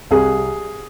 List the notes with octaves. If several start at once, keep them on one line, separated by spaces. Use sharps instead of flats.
C2 G#4